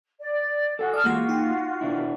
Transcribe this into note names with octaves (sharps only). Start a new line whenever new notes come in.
D5
F#4 A4 G5 G#5
D5 A5 D6 D#6 F6
E3 G#3 A#3 F4 F#4 G#4
D#4 G5
B2 D4 E4